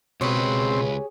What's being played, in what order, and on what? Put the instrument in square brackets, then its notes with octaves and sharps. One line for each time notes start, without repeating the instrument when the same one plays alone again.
[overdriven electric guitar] C#2 B4 [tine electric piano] B2 [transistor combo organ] C4 [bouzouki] G4 G#4 C#5